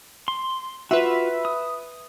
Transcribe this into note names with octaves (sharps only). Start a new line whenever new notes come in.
C6
F4 F#4 B4 E5
D#6